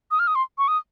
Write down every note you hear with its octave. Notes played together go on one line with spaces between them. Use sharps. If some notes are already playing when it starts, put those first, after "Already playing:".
D#6
F6
D#6
C6
C#6
D#6